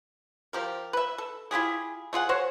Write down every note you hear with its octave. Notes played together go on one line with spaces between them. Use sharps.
F3 G4 A#4
B4 E5
A4
E4 F4 G4 G#4
A3 F4 G#4 F#5
F#4 C5 C#5